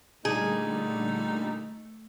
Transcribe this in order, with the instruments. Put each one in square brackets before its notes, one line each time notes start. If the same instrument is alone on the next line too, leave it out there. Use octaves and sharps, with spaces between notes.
[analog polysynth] A#2 D3 G3 [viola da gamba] A3 [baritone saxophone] D#4 [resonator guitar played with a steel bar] G#4